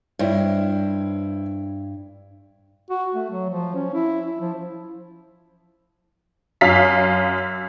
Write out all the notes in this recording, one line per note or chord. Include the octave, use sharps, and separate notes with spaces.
G2 E4 C5 C#5
F#4
A3
F#3
F3
C#4
E4
E4
F3
F#2 F5 B6